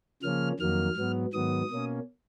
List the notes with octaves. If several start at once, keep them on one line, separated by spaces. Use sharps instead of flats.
C#3 F3 A#3 C#4 F6
F2 D#3 F#3 A#3 F6
G#2 F#3 B3
G#2 D#3 F#3 B3 D#6
B2 A#3 C#4